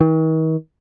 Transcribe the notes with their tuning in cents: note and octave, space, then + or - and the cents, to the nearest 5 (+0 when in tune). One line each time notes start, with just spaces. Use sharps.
D#3 +45